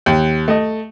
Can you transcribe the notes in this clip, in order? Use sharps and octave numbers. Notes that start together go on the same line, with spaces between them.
D#2
A3 D#5